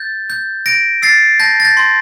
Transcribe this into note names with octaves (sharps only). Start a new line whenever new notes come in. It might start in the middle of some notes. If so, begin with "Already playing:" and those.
Already playing: G6 A6
G6
G6 A#6 D7
E6 A6 C7
A5 G6 A#6
A6
G6 A#6
C6